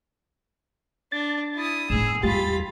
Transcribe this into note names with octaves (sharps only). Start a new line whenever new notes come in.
D4 A5 A6
E4 D#6
A2 B3 G#4 E6
E2 G3 F4 G4 B5 A6